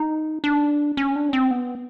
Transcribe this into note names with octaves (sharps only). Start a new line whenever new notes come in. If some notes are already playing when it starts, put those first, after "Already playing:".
Already playing: D#4
D4
C#4
D4
C#4
C4
B3